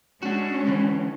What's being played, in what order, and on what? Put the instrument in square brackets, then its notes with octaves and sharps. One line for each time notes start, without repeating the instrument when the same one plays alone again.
[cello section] G#3 C#4 [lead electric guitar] D4 F#4
[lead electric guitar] D3 E3